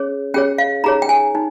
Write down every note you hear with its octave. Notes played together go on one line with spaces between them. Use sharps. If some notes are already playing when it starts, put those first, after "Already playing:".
Already playing: C#4 G#4 C#5
C#4 G#4 C#5 G5
F5
D#4 G#4 C#5 A#5
G5
G#5
D#4